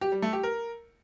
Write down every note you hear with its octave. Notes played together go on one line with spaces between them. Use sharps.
G4
G3
A3
G4
A#4